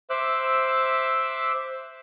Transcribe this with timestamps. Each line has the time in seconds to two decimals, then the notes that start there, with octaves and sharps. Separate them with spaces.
0.10 C5 E5 D6 E6 F#6